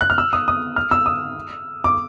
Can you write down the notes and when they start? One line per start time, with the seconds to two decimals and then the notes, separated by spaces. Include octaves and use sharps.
0.01 F#6
0.10 F6
0.18 E6
0.33 D#6
0.48 D#6
0.76 F6
0.91 E6
1.06 D#6
1.84 D6